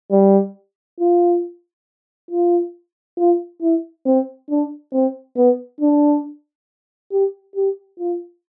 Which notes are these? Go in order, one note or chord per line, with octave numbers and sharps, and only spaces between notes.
G3
F4
F4
F4
E4
C4
D4
C4
B3
D4
G4
G4
F4